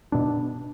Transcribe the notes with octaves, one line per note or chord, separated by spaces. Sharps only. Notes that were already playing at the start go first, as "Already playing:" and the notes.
B2 B3 D4